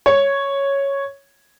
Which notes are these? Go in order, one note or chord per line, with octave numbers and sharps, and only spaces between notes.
C#5